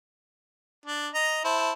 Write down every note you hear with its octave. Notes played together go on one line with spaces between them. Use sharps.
D4
D#5 A#5
E4 C5 A5